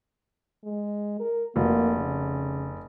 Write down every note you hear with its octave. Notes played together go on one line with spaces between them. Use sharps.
G#3
A#4
F1 A#3 F#4
C#3